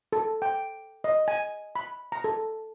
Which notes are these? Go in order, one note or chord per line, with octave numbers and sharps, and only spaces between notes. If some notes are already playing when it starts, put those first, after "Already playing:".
A4
G5
D#5
G#5
B5
A#5
A4